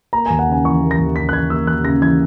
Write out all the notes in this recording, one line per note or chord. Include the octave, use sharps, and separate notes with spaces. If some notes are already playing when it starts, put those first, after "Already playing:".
A#3 A#5
D#2 G#5
F#5
C#3 G#5
E3 C#6
A#3
A#6
D#2
C#3 B6
F#6
E3 G#6
A#3 E6
D#2 F#6
C#3 A#6
E3 G#6